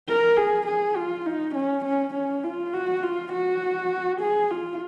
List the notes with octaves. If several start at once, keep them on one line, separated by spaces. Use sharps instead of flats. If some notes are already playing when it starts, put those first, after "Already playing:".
A#4
G#4
G#4
F4
D#4
C#4
C#4
C#4
F4
F#4
F4
F#4
G#4
F4